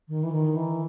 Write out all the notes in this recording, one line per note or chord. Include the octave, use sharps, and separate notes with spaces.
D#3
E3
D#3
E3